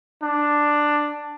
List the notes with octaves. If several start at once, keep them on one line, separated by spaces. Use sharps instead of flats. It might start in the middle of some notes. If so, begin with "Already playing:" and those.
D4